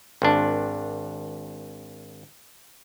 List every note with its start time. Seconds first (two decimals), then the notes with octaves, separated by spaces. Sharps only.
0.22 G#1 D4